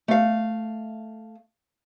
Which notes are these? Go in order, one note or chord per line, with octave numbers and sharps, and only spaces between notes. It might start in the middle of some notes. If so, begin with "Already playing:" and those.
A3 F5